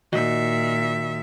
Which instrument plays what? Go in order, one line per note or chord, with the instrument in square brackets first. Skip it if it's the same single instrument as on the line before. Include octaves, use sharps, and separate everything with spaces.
[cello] A#2 E5 [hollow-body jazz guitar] D#3 F#4 D#5